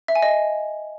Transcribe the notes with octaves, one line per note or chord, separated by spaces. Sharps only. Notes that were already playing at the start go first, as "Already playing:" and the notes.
E5
G#5
D#5